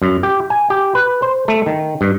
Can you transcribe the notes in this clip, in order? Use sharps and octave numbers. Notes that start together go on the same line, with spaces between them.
F#2
G4
G#5
G4
B4
C5
A3
D#3
G2